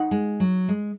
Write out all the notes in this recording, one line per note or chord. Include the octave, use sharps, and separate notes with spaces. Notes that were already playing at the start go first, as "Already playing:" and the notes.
Already playing: D#4 F#5
G#3
F#3
G#3